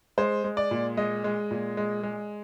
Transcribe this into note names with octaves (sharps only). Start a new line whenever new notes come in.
G#3 C5
G#3
D5
A#2
G#3 D#5
G#3
A#2
G#3
G#3